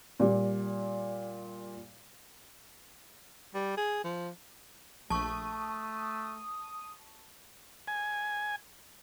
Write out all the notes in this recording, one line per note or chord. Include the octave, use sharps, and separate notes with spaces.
A#2 G3
G3
G#4
F3
A#1 A3 A5 C#6 D#6
G#5